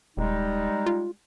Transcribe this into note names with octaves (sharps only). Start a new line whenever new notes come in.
D#1 G3 G#3 D#4
F4